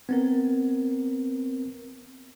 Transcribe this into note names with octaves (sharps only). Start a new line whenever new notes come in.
B3 C4 A#4